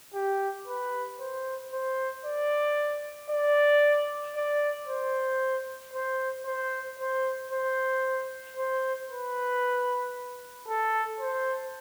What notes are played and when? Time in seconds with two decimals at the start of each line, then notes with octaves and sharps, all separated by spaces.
0.14 G4
0.68 B4
1.20 C5
1.73 C5
2.25 D5
3.30 D5
4.36 D5
4.88 C5
5.94 C5
6.46 C5
7.00 C5
7.52 C5
8.57 C5
9.10 B4
10.68 A4
11.21 C5